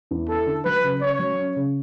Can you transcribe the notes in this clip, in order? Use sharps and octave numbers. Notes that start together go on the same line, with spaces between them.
E2
E4 A4
D3
F#3 B4
C#3
C#4 C#5
F#3
C#4
C#3